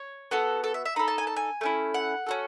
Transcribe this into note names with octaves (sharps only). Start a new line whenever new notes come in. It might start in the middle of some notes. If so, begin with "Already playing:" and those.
Already playing: C#5
B3 F#4 A4
A4
E5
E5
D#4 A4 B5
A5
G#5
A5
G#5
A3 C#4 E4
F#5
C#4 F#4 A4